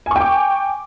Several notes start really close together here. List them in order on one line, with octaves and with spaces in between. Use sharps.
G#5 C#6 G5 D6